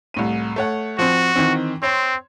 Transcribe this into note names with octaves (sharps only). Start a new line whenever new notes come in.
C2 A2 D#7
A3 C#5 F#5
F3 C4 F#4
D#3 E3 C4
C4 C#5 C6